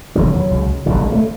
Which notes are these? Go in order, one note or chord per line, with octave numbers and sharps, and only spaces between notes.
E1 D#2 C#3 F#3
C#2 C#3
F1 D#2 D3 F#3
G3
G#3
A3